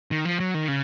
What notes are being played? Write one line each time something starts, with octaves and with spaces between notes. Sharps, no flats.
D#3
F3
F#3
D#3
C#3